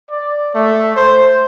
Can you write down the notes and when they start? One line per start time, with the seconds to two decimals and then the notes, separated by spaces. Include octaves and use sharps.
0.11 D5
0.55 A3
0.96 C5